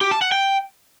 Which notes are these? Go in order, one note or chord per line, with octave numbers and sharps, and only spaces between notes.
G4
A5
F#5
G5